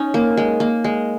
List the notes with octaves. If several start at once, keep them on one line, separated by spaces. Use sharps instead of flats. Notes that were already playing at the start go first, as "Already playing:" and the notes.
Already playing: C#4 D#4
A#3
G#3
A#3
G#3